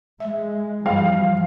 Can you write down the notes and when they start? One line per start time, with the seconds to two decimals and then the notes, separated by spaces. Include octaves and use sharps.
0.20 G#3 E5
0.86 G2 E3 F3 G3 F5